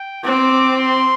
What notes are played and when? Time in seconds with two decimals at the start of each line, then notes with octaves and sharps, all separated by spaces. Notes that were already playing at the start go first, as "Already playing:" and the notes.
Already playing: G5
0.24 C4 D6
0.78 C6